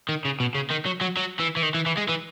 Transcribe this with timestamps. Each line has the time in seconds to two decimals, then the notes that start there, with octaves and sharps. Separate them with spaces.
0.09 D#3
0.25 C#3
0.40 B2
0.55 C#3
0.71 D#3
0.86 F#3
1.01 F#3
1.17 F#3
1.39 E3
1.57 E3
1.63 D#3
1.75 E3
1.86 E3
1.97 G#3
2.09 E3